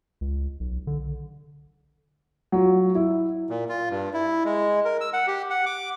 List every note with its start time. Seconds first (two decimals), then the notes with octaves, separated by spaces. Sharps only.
0.21 C#2
0.60 B1
0.87 D3
2.52 F#3 F4
2.95 E4
3.50 A#2
3.69 F4
3.90 G2
4.14 E4
4.45 G#3
4.85 A#4
5.01 E6
5.13 F#5
5.27 G4
5.50 F#5
5.66 D6